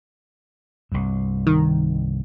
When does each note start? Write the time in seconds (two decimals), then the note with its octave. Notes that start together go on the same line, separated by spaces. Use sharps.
0.92 C2 G2
1.47 D#3